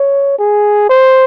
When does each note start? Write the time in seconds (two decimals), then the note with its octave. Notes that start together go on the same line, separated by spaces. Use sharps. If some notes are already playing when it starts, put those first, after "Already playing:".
Already playing: C#5
0.38 G#4
0.89 C5